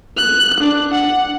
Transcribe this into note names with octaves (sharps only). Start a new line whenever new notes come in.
F#6
D4
F#5